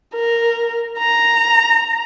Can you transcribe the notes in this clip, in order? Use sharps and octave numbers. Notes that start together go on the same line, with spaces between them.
A#4
A#5